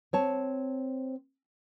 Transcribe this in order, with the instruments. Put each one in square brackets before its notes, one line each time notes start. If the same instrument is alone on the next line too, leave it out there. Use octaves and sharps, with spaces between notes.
[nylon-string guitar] C4 C#5 A5